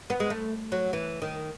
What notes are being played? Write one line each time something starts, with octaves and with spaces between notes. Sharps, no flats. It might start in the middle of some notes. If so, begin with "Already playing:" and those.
B3
G#3
A3
F#3
E3
D#3